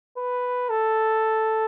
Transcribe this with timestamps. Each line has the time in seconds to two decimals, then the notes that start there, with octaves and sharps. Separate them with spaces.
0.17 B4
0.70 A4